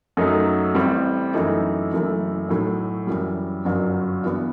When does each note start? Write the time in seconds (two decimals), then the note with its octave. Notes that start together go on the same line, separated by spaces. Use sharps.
0.17 F#2 F#3 A3 D#4
0.75 A1 A2 G3 C4
1.33 F#2 E3 A3 D#4
1.92 F#1 F#2 E3 A3
2.49 B1 A2 F#3 A3
3.07 F#2 E3 G3
3.65 G1 F#2 F#3
4.24 G2 E3 B3